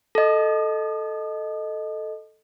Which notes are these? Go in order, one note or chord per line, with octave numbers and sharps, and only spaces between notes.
A4 D#5